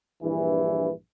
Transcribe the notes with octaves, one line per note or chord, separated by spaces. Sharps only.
A#1 G2 E3